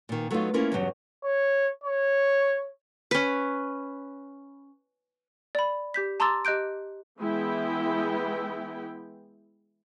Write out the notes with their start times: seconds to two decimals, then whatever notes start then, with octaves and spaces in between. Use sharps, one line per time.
0.09 A#2 D#3
0.31 F#3 A3 B3 C4 D#4 F4
0.54 A#3 C#4 E4 F4 A#4
0.72 E2 G2 C#3 F#3 G4
1.24 C#5
1.83 C#5
3.11 C#4 B4
5.55 D5 B5
5.94 G4 G6 B6
6.20 A5 A#5 C6 D6 E6 A6
6.45 G4 D#5 F#6 G6 D7
7.20 E3 G#3 B3 E4 G5